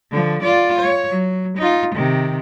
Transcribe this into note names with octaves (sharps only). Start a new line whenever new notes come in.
D3 F3
F4 D5
C#5
F#3
D#4 F4
C3 D#3